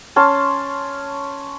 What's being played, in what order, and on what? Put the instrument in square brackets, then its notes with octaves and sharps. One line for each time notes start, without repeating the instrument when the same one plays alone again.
[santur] C#4 A5 C6